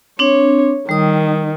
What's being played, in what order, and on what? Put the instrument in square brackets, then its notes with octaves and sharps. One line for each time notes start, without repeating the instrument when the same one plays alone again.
[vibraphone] C4 D4 [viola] C#5
[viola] D#3 [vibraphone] G3 D#6